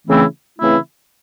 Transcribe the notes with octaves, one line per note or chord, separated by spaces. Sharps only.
C#3 E3 A3 C4 E4
C#3 E3 A3 C4 E4